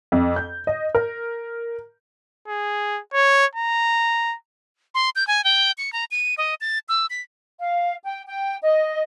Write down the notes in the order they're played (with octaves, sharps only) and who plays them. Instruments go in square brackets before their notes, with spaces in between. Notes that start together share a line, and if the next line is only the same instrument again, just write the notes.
[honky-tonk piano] F2
G6
D#5
A#4
[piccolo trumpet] G#4
C#5
A#5
[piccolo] C6
G6
G#5
G5
C#7
A#5
D#7
D#5
A6
E6
B6
[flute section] F5
G5
G5
D#5